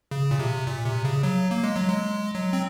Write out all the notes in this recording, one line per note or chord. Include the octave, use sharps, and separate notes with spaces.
C#3
A#2
C3
A#2
C3
C#3
F#3
A#3
G#3
F#3
G#3
F#3
C4